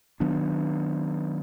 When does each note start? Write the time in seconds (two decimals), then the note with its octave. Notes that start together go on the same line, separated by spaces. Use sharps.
0.20 D#3 F#3 B3 D4